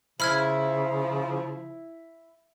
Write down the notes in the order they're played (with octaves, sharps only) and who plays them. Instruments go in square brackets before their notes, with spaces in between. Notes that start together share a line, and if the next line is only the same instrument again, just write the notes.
[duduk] C#3 [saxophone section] F3 [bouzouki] E4 [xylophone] B5 F6 G#6